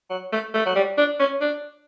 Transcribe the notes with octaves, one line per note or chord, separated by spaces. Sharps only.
F#3
A3
A3
F#3
G3
D4
C#4
D4